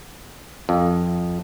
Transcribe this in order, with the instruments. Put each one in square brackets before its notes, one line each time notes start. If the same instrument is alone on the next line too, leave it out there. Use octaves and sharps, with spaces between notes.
[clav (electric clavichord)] F2